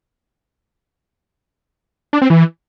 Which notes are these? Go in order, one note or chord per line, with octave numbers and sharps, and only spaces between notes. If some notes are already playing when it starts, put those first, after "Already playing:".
D4
C4
E3